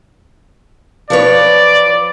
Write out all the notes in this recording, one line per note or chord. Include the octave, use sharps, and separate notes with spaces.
F3 B4 C#5 D5